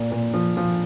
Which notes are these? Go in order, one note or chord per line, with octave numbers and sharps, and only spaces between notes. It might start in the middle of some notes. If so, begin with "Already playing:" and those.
Already playing: A#2
A#2
F3
F3